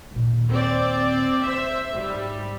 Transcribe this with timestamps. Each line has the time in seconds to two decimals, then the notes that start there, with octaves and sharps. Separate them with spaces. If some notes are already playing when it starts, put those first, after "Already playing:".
0.12 D#2 A#2
0.50 C4 D5
1.43 C5 E5
1.95 G#2 G3